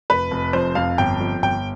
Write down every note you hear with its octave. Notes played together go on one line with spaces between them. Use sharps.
F1 B4
F1
F2 C5
F2 F5
G1 G5
F2
G1 G5